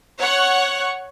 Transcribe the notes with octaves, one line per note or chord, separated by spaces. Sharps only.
C#5 F#5 C#6 F#6